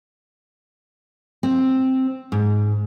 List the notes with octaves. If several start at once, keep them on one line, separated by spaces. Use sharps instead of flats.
C4
G#2